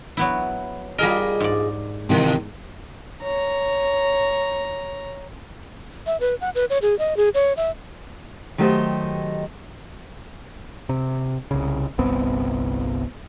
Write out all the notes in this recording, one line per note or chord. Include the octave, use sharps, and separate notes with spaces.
F#3 B3 E4
G3 F4 G#4 A#4 D#5
G#2 D5
G2 C3 D#3 E3
C#5 A#5
E5
B4
F#5
B4
C#5
G#4
D#5
G#4
C#5
E5
D#3 F#3 A3 G4 C5 D#5
C3
C2 C#3
G1 C2 B3 C4